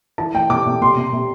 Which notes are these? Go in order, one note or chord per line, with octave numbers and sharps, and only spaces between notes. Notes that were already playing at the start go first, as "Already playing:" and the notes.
E3 A5
A3 G5
C3 D6
C3
C3 C6
C3
C3